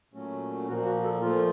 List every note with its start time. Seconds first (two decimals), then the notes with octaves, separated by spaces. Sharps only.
0.14 A#2 F#3 A3 C#4
0.68 A#2 F3 A#3 F#4
0.85 F#4
1.04 A4
1.21 A#2 F3 A3 F4